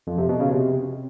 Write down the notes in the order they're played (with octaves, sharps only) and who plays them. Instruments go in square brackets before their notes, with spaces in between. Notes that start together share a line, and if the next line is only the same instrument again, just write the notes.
[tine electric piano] F2
C3
B2
C#3
C3